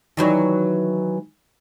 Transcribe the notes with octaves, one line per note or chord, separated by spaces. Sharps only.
D#3 E3 F#3